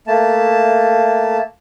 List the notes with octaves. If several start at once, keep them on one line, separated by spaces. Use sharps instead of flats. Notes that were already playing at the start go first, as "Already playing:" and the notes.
A3 A#3 A5